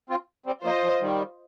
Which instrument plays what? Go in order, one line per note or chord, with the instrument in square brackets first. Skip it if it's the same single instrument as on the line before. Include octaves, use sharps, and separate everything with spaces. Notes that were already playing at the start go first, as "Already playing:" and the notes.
[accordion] C4 F4
G3 C4
[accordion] F3 A#3 [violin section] F4 C5 D#5
[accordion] F3
D#3 G3